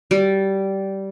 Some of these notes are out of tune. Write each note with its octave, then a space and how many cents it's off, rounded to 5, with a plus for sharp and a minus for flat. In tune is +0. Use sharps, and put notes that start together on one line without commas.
G3 -15